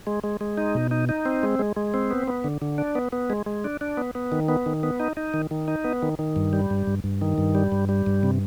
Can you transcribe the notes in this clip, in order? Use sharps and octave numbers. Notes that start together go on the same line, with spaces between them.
G#3
G#3
G#3
D#4
B2
D#4
D#4
C4
G#3
G#3
G#3
C4
B3
B3
D3
D3
D4
B3
B3
G#3
G#3
D4
D4
B3
B3
D#3
B3
D#3
B3
D#4
D#4
D#3
D#3
D#4
B3
D#3
D#3
G2
G3
G2
G2
G2
D#3
G2
G3
G2
G3
G2
C3